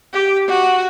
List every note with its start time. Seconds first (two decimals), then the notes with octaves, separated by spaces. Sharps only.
0.13 G4
0.48 F#4